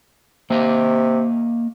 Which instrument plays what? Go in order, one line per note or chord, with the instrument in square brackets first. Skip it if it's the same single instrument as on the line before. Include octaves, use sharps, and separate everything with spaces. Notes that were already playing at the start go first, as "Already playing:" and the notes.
[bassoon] C3 [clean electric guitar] A#3 D#5 F5